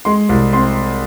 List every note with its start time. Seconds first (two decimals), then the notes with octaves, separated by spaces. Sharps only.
0.05 G#3 C6
0.29 C2
0.53 C4 C6